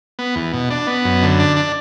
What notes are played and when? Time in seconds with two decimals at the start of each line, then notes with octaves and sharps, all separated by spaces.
0.19 B3
0.36 E2
0.53 B2
0.70 D4
0.87 B3
1.05 F#2
1.23 D3
1.39 D4
1.56 D4